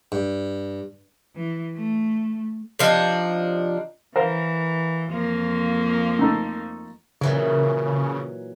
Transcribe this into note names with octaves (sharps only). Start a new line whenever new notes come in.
G2
E3
A3
C3 F3 D4 D#4
E3 A#4 C5 F5
F2 F3 A#3
A3 D#4 A4
A#2 C#3 E3 F#3